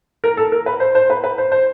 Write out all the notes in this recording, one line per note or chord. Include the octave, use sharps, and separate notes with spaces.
A#4
A4
A#4
B4
C5
C5
B4
B4
C5
C5